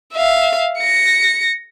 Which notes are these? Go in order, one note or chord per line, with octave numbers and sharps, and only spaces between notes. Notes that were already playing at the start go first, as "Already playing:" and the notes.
E5 F5
A#6 C#7